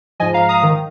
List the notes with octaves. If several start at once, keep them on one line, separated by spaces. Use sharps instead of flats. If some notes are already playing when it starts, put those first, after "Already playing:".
G#2 F3 D#5 G#5
F5 A#5
A#5 D#6
D#3